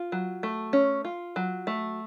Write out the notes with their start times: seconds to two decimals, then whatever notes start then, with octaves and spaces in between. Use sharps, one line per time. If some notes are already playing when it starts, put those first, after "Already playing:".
Already playing: F4
0.12 F#3
0.43 A3
0.73 C#4
1.05 F4
1.36 F#3
1.67 A3